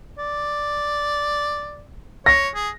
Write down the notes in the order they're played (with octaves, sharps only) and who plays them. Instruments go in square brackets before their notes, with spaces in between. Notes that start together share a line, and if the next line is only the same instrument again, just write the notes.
[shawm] D5
[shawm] C#5 [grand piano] A#6
[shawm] G#4